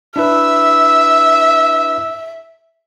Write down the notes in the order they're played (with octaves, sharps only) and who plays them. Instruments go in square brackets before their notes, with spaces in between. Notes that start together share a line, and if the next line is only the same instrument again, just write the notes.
[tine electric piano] D4 E4 B4 [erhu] E5 [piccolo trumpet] E6